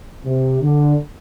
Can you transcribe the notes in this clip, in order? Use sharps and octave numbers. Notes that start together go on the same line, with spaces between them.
C3
D3